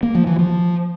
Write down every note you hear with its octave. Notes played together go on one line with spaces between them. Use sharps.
A#3
F3
E3
F3